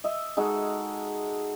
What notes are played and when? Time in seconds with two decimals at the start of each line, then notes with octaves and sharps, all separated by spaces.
0.04 D#5 E5
0.37 G#3 D#4 F#4 A4